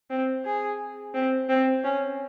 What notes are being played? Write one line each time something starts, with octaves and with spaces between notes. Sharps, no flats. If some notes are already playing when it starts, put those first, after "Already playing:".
C4
G#4
C4
C4
C#4